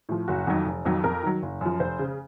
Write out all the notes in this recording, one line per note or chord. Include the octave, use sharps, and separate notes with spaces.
A2 F3
F#1 F#4
F2 D#3 F#3
F1
F2 D#3 F#3
F2 A#4
D#3 F#3
F#1
F#2 F3
F1 C5
C#3